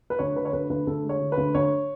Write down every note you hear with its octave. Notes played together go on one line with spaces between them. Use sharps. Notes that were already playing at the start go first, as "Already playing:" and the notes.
B4
D2 C#5
D3 B4
C#5
D2 B4
D2 B4
D2 A4
G#3
C#5
D3
B4
D2
D2 C#5